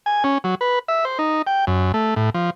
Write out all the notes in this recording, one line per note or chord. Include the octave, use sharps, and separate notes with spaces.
G#5
C#4
F#3
B4
E5
C5
D#4
G5
F#2
A3
A2
F3